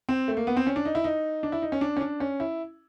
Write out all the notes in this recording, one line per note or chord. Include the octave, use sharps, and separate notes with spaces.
C4
A3
A#3
B3
C4
C#4
D4
D#4
E4
D#4
D4
E4
D#4
C#4
D4
C#4
D4
C#4
E4